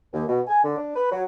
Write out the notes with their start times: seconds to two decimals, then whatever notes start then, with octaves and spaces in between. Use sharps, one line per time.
0.13 D#2
0.28 B2
0.48 G#5
0.63 D3
0.77 D4
0.95 B4
1.11 F#3